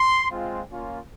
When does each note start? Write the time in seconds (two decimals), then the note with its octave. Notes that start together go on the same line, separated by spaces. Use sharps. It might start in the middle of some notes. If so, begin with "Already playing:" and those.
Already playing: C6
0.30 G#3 C4 F4
0.68 A#3 C#4 F4